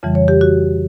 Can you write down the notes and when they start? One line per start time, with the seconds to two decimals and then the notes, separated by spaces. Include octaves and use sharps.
0.03 F2 C#3 E3 G3
0.15 C#5
0.28 G4
0.41 F#4